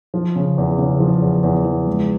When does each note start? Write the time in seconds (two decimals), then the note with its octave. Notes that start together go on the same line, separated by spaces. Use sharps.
0.14 F3
0.36 C#3
0.58 E2
0.78 C#3
1.00 F3
1.22 E2
1.43 E2
1.65 F3
1.87 C#2